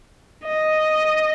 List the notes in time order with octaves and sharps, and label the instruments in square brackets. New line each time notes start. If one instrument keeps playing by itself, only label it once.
[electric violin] D#5